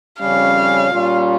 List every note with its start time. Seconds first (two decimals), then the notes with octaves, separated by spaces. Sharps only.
0.20 F2 C#3 G3 C#4 F5
0.91 A#2 G3 C#4 F4